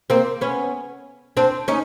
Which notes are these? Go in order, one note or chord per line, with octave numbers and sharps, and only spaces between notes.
A#3 C4
B3 C#4
C4 D4
C#4 D#4